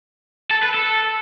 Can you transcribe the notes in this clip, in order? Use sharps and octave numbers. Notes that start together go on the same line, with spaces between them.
A4
B4
A4